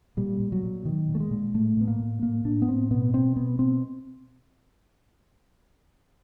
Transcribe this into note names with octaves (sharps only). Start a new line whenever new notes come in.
A#2 G3
A#2
F#3
A#2
A#2 D#3
A#2
A3
G#3
A#2
A2 A3
A2 B3
A#3
A2
A2 A#3
A2 D4
B3
A2 C4
B2 B3
B2 C4
B2 B3
B2 C4